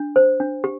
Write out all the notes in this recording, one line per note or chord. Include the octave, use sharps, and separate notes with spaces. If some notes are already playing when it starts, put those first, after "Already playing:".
Already playing: D4
C5
D4
G4